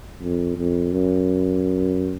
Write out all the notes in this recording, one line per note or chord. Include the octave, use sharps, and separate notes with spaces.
F2
F2
F#2